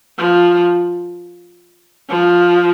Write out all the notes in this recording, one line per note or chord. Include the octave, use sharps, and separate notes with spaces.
F3
F3